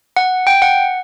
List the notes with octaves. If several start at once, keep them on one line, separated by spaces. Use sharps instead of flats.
F#5
G5
F#5